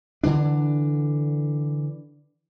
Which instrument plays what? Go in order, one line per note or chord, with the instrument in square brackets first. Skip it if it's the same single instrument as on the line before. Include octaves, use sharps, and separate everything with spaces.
[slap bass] D3 E3 D4